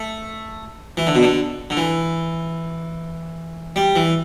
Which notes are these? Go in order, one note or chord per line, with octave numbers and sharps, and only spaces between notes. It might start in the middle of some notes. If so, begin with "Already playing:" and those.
Already playing: A3
E3
D3
B2
D3
D3
E3
G3
E3